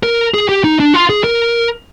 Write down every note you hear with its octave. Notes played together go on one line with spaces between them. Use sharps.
A#4
G#4
G4
D#4
D4
F4
G#4
A#4